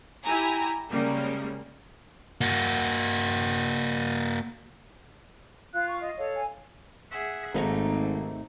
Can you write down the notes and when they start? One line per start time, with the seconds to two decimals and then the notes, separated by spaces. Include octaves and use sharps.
0.23 E4 G4 G#5 A#5
0.90 C#3 G3 G#3 A#3
2.41 A#3 F#4
5.73 F4 F5 F#6
5.87 C#6
6.01 D#5
6.18 A4 C#5 F5
6.35 G#5
7.10 G#4 E5 F#5
7.54 G#1 G#2 C3 A3 A#3 D#4